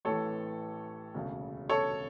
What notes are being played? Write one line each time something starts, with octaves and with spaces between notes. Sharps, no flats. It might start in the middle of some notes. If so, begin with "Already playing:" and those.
A1 A2 E3 A4 C#5
E1 D2 C#3
A4 C#5